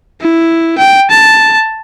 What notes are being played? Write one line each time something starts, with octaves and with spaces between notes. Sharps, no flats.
E4
G5
A5